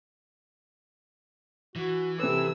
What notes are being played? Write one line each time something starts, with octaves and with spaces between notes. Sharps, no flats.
E3 F#4
C3 A4 B4 E6